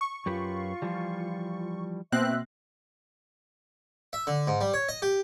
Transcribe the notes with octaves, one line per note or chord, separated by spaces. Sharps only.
C#6
F#2 F4 G4 B4
E3 F3 G3
B2 A#3 C4 E5 E6 F#6
E5
D3
G#2
G3
C#5
D#5
G4